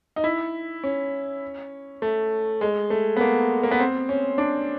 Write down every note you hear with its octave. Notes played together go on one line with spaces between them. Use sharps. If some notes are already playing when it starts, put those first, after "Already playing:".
D#4
E4
C#4
A3
G#3
A3
B3
A#3
A#3
B3
C4
C#4
D4